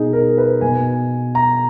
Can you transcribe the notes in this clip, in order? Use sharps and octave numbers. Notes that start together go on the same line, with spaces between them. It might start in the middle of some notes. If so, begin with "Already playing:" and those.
Already playing: B2 D#4 G#4
A#4
B4
B2 G#5
A#5